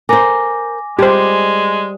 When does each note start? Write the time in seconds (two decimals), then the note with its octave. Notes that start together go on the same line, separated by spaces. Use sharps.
0.09 A#4 C5 G#5 D6 A#6
0.99 G3 G#3 G4 C5